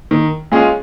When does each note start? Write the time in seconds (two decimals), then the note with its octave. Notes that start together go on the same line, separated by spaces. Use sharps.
0.11 D#3
0.52 G#3 C#4 F4 G#4